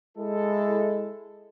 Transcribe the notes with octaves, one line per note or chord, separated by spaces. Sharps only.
G#3 E4 A4